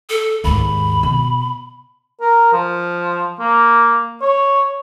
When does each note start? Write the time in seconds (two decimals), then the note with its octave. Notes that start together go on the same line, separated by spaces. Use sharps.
0.10 A4
0.44 D#2 G#2 B5
1.03 B2
2.21 A#4
2.53 F3
3.40 A#3
4.22 C#5